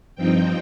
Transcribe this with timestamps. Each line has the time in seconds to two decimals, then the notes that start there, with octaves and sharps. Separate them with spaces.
0.15 G2 F3 C4 D#4 G5